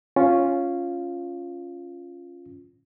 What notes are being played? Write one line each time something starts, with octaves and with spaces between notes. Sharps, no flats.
C#4 F4